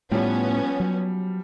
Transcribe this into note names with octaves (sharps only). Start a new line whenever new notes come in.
A2 F3 G3 B3 C#4
F#3